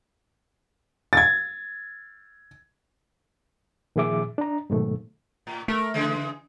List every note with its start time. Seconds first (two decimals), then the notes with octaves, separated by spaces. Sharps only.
1.13 G#6 A6
3.96 A#2 D#3 F3 G#4 E5 D6
4.38 D4 A#5
4.70 G#2 B2 D#3 F#3 A3
5.47 A2
5.68 A3 A4 A#4
5.94 C#3 E3 G#3